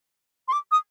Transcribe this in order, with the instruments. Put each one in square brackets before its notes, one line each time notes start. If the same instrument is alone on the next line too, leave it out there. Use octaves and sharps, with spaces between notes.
[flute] C6
D6
D#6